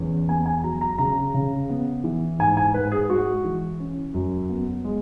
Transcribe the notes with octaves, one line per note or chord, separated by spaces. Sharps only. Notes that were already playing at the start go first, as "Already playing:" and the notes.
Already playing: E2 C#4
B3 G#5
G#5
F#3 A#5
A#5
C#3 A#5
C#3
B3
E3
G#2 G#5
G#5
G#2 B4
G#4
G#3 F#4
E3
C#4
F#2
B3
G#3